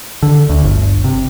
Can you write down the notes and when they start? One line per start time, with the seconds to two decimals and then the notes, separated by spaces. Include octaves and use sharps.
0.23 D3
0.49 D2
0.64 G1
1.04 C3